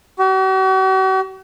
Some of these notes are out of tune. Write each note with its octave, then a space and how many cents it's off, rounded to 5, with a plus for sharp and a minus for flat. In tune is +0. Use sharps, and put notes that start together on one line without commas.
F#4 +45